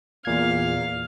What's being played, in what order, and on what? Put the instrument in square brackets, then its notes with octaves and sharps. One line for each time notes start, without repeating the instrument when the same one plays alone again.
[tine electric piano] E2 A#2 G#6 [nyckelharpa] F5